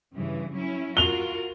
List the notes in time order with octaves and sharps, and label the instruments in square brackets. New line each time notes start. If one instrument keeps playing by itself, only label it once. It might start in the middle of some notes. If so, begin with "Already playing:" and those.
[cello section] G2 C#3 E3
F#3 C#4 E4
[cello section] F4 F#4 A#4 [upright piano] F7 G7